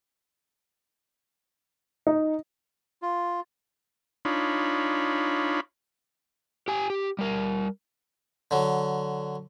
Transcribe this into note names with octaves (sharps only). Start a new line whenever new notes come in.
D#4
F4
D4 D#4 F4 C#5 B5
G4 G#5
G4
G3 A#4
D3 F#3